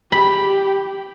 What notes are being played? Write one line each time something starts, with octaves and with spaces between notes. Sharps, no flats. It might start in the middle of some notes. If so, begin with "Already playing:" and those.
G4 B5